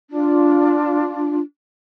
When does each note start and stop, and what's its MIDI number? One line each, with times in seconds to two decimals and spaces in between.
0.11 1.39 62
0.11 1.39 65